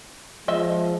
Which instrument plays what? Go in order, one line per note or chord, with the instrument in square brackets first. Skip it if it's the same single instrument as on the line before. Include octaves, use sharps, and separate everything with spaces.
[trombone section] F3 G#3 [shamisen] D#5 E5